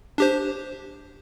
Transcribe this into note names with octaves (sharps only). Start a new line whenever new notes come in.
D4 G4 C5